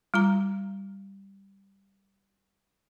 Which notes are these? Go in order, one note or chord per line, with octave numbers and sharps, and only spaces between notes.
G3 F4 A#5